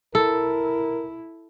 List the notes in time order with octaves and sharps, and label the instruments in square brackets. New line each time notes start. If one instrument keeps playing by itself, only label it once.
[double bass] E4 [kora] A4 [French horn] A#4